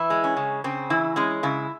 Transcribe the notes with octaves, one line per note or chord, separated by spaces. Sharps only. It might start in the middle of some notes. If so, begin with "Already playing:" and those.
Already playing: E3 E4
G#3
C#4
C#3
C#3 C4
E3 E4
G#3 C#4
C#3 E4